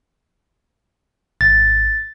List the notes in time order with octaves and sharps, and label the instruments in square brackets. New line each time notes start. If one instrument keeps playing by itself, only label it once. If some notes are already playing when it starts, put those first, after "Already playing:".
[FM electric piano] G#1 [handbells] A6